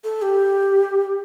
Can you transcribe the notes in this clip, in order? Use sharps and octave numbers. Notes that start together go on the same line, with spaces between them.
A4
G4